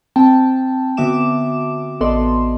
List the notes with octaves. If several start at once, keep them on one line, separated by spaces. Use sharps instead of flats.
C4 G5 A5
D3 B3 F#4 E5 D6 E7
A1 B3 A4 D5 D#5 C6